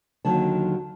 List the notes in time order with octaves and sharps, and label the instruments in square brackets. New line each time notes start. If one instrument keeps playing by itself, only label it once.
[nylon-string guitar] D#2 D3 D#3 F#3 A5